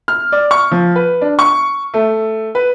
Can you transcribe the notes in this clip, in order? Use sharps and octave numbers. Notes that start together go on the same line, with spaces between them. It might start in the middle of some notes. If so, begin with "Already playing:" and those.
F6
D5
C#6
F3
B4
D4
C#6
A3
B4